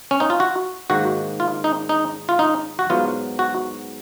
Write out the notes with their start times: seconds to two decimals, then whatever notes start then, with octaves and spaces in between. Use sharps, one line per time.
0.11 C#4
0.20 D#4
0.30 F4
0.40 F#4
0.90 G#2 D#3 A#3 F#4
1.40 F4
1.64 D#4
1.89 D#4
2.29 F4
2.39 D#4
2.79 F#4
2.90 G#2 F#3 B3 F4
3.39 F#4